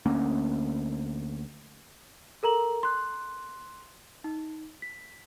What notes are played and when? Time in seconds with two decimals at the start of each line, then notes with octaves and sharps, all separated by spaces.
0.06 D2 A#3 C#4
2.43 A4 A#4 A#5 F#7
2.83 C6 F#6
4.24 D#4
4.82 B6